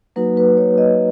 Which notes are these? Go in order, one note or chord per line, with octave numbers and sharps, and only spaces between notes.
F#3 A#3 D#4 F#4 B4
B4
C#5
D#5